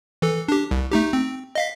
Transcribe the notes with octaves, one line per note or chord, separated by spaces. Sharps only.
E3 A4
D4 G4
C2
A3 D#4 G4
C4
D#5 F5 B6